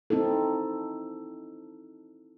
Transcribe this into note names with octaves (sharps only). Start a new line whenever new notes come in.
C4 D#4 E4 A4